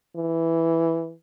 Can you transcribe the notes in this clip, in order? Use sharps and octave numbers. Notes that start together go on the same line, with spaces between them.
E3